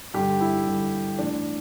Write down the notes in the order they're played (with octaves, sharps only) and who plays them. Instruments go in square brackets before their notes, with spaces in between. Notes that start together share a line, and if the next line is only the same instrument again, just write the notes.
[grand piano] G2 D3 G4
E4
G2 D3
A2 E3 D4